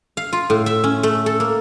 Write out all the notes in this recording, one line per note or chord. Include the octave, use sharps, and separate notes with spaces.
F5
F4
A2
E5
C#4
A3
A4
A#3